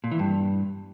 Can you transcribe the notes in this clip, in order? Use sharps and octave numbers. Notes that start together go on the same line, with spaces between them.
A#2
E3
G2